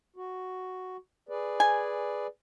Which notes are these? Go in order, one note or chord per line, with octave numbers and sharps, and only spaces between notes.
F#4
G#4 B4 D5
G#5